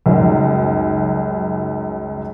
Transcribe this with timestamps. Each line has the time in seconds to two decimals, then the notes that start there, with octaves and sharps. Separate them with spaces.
0.06 C#2 F#2 D#3 F#3 G3